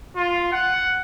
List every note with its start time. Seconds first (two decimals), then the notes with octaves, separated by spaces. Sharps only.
0.16 F4
0.52 F#5